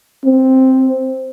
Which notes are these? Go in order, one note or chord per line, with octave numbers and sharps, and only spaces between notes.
C4